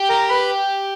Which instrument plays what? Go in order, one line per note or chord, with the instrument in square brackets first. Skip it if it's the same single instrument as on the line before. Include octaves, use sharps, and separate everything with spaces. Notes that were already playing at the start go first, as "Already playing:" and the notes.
Already playing: [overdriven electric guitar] G4
[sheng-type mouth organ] A#4 A#5
B4 B5